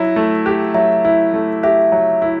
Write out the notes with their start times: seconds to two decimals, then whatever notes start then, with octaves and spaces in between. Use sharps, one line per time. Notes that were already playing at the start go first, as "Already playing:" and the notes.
Already playing: F#3 E4
0.16 A3
0.46 G4
0.74 F#3 E5
1.05 E4
1.34 A3
1.63 G4 E5
1.92 F#3
2.22 E4